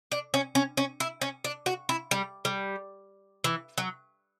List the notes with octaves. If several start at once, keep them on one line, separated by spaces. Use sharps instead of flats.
D4
C#4
C#4
C#4
E4
C#4
D4
F#4
E4
G3
G3
E3
F#3